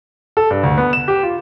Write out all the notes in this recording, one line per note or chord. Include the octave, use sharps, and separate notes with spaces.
A4
G2
D2
B3
E7
G4
F4